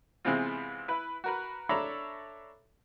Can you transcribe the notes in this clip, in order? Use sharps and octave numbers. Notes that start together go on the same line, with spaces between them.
C3 E3 G#3 B3 C4 F4
E4 B4
F#4 A#4 B4
D4 A4 C#5 E5 A#5 B5